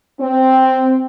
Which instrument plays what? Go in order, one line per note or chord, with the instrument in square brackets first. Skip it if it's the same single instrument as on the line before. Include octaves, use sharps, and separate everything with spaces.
[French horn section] C4